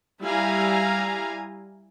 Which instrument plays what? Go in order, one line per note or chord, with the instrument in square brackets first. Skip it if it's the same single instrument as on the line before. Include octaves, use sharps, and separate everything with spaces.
[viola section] G3 E4 F5 G#5 A#5